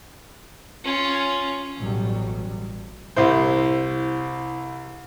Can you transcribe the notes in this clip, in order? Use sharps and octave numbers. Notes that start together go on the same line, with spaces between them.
C#4 F4
A1 B2 F#3 G3
C2 E4 C5